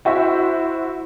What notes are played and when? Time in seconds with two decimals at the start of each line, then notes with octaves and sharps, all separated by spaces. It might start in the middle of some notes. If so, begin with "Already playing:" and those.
0.05 E4 F#4 C5 E5